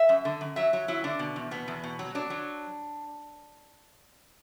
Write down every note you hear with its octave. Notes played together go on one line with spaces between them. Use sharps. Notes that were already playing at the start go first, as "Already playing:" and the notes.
Already playing: E5
F#2
D3
F#2
F#3 E5
F#3
F#3 E4
D3 D4
B2
E2
B2 B3
E2
B2
F#3
F#3 D4
F#3